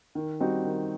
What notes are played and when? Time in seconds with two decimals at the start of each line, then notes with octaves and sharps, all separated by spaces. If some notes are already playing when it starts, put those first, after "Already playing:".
0.15 D#3
0.40 G3 C4 D#4 F#4
0.65 D#3